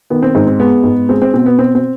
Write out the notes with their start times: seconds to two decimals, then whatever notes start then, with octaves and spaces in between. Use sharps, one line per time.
0.10 D#3 B3
0.23 C4
0.35 G#2 C4
0.47 C4
0.60 G#3 B3
0.84 G#2
1.09 G#3 C4
1.22 C4
1.34 B2 C4
1.46 B3
1.58 B2 C4
1.75 C4